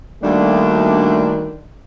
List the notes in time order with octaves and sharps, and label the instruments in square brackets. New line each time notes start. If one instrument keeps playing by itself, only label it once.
[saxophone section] D2 D4 [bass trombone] D#3 [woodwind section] G3 A#3 [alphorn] A3